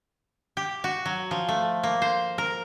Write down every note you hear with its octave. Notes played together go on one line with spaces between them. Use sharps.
G4
F#4
F#3
F3
A3
A#3
C5
A#4